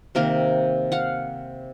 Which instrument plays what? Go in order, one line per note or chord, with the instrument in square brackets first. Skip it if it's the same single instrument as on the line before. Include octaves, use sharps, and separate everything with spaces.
[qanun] C3 D#3 A#3 A#4
F5 F#5